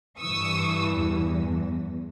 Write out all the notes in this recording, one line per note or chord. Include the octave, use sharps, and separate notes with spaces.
G2 E3 C#6 D#6 E6
E2